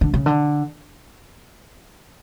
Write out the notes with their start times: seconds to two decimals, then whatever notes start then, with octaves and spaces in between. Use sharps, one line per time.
0.01 D3
0.14 C#3
0.26 D3